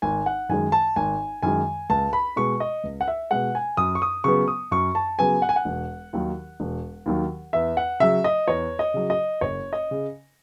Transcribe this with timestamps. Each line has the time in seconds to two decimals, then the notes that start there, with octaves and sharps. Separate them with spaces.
0.02 G#1 G#5
0.26 F#5
0.49 F#2 D#3 G#3 G#5
0.72 A5
0.96 G#1 G#5
1.43 F#2 D#3 G#3 G#5
1.89 C#2 A5
2.13 B5
2.36 B2 G#3 C#6
2.60 D#5
2.84 C#2
3.01 F#5
3.08 E5
3.31 B2 G#3 F#5
3.55 G#5
3.77 F#2 D#6
3.95 C#6
4.02 D#6
4.24 C#3 F#3 B3 C#6
4.48 D#6
4.71 F#2 C#6
4.95 A5
5.19 C#3 F#3 B3 G#5
5.42 F#5
5.49 G#5
5.56 F#5
5.65 E1
6.13 D#2 D#3 F#3
6.60 E1
7.06 D#2 D#3 F#3
7.53 E2 E5
7.77 F#5
8.00 C#3 F#3 E5
8.24 D#5
8.48 E2 C#5
8.79 D#5
8.94 C#3 F#3
9.10 D#5
9.41 F#1 C#5
9.73 D#5
9.91 C#3